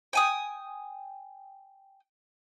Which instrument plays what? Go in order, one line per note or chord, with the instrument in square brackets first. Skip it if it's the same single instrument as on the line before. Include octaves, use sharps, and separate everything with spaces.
[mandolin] G5 G#5 D#6